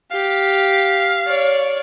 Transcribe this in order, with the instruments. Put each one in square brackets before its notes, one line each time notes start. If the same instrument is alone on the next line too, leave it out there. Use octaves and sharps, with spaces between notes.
[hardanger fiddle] G4 [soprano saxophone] F5
[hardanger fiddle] C#5 D5